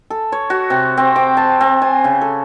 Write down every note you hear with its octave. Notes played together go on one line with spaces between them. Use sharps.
A4
C#5
F#4
C3
C4
D6
A5
C4
G#5
C#3
A4